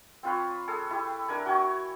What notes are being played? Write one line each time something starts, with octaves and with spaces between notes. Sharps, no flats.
C4 F4 B4 C#5
G#4 A4
E4 G4
D4 A#4 G#5
F#4 G5 G#5 C#6